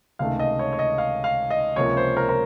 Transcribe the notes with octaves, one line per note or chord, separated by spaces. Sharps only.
C#2 C3 D#3 A3 F5
D#5
C#5
C#5
D#5
F5
F5
D#5
C#2 C3 F3 A#3 C#5
C5
A#4
A#4